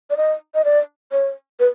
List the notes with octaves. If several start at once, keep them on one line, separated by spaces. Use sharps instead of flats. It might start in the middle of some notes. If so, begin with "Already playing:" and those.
D5
D#5
D#5
D5
C#5
B4